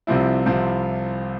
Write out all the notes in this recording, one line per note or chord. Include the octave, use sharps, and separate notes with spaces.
C2 C3 F3 C4 E4
C2 C3 F3 C4 E4